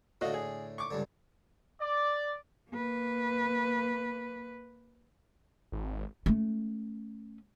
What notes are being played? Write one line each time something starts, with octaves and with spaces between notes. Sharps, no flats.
A2 D3 F#4 D#5 F5
G#4
C#6 D6
C#2 G2 D3
D5
A#3 B4
G#1
A3 C#4